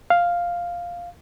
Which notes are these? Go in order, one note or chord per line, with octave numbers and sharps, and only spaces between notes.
F5